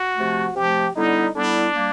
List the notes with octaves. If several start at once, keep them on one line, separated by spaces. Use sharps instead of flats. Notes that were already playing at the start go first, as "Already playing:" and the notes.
Already playing: F#4
C3 F3 A3
C3 F3 A3 G4
D3 G3 B3 D#4 E4
D3 G3 B3 D4 E4
G3 A#3